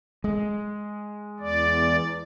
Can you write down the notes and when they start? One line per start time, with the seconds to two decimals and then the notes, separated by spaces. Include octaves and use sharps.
0.24 G#3
1.40 E2 D5